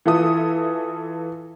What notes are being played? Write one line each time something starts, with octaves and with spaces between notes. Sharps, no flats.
E3 F4 A4 E5 D#6